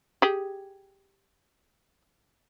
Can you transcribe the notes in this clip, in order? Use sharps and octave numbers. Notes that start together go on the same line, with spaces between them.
G4 G#4